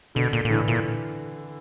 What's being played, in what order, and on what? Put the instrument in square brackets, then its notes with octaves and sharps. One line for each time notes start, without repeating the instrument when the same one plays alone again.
[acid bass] B2 [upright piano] D3
[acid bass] A#2
A#2
[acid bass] A2 [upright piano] D3 E3
[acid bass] A#2